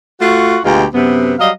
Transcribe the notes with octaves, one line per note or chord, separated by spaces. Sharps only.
A3 F4 F#4
D2 B2 G#3 F4 G4
F#2 C3 B3
F#3 G3 D#5 F5